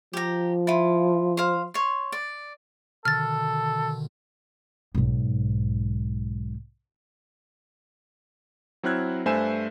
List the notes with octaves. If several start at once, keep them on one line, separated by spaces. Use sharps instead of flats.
F3 G4 A#5
E4 F4
C5 F5
C#5 C6
D5
B2 D3 D#3 A4 F6 A6
B1 G#2
F#3 C4 E4 F6 F#6 G#6
G2 A3 C5 E5 G#5 E7